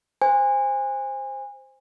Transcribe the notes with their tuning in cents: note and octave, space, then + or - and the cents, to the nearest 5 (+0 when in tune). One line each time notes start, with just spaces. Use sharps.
C5 +0 G#5 -30